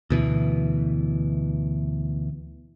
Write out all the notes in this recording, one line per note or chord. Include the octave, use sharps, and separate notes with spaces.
D2 B2 E3